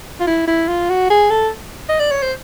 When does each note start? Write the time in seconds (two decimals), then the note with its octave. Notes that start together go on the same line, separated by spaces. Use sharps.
0.20 F4
0.27 E4
0.48 E4
0.68 F4
0.90 F#4
1.10 G#4
1.30 A4
1.89 D#5
1.99 D5
2.11 C#5
2.22 C5